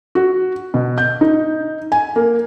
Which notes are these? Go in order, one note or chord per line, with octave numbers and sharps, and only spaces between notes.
F#4
B2
G6
D#4
G#5
A#3